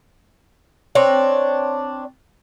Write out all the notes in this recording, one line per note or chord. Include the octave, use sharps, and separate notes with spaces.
C4 D4 C#5